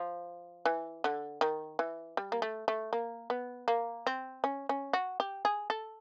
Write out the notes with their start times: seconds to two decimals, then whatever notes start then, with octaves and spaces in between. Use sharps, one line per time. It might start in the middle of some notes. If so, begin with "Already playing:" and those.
Already playing: F3
0.65 E3
1.04 D3
1.41 D#3
1.79 E3
2.17 G3
2.32 A#3
2.42 A3
2.68 A3
2.93 A#3
3.30 B3
3.68 A#3
4.07 C4
4.44 C#4
4.69 C#4
4.93 F#4
5.20 G4
5.45 G#4
5.70 A4